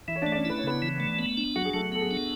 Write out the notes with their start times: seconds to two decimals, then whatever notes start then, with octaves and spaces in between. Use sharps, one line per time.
0.08 E3 E4 E5
0.16 C#5
0.22 D4 D5
0.27 A3
0.32 D5
0.35 C#4 C#5
0.45 E4 B4
0.58 C#5
0.64 C#3 B3 B4
0.82 E3
1.00 A3
1.19 B3
1.37 D4
1.56 F#3 F#4
1.65 G#4
1.74 F#3 A3 A4
1.92 B3 A4
2.01 G#4
2.11 D4